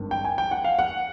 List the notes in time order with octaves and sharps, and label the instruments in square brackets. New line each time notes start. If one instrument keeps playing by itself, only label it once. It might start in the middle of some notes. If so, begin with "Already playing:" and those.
Already playing: [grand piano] G#1 G2 D#3
G5
G#5
G5
F#5
F5
F#5